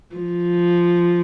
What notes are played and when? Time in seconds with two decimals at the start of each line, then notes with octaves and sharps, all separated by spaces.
0.15 F3